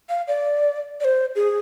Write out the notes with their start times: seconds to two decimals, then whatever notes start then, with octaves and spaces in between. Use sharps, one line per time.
0.09 F5
0.28 D5
1.00 D5
1.04 C5
1.35 G#4